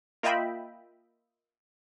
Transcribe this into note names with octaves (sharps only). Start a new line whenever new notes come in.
A#3 F4 D#5 E5 G5 B5